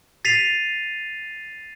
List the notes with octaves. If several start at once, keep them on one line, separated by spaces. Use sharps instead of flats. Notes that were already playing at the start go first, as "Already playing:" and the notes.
A6 B6 C7 D#7 F7